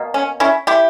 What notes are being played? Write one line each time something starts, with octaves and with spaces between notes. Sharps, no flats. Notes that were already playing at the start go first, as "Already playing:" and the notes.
Already playing: B2 A#3
C#4
C#4 E4
E4 G4